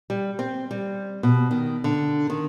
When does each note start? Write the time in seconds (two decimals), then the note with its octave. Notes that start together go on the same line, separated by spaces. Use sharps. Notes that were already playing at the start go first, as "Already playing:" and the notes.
0.10 G3
0.39 C4
0.71 G3
1.23 B2
1.51 D#3
1.84 D3
2.30 D#3